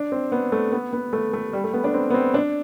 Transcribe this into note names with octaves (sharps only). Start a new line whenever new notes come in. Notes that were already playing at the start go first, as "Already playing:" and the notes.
Already playing: D4
C4
B3
A3
B3
B3
A3
A3
G3
A3
B3
D4
C4
B3
C4
D4